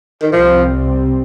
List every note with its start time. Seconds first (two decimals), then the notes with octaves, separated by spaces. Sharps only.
0.22 D#3
0.32 C2 C3 F3 G3 C4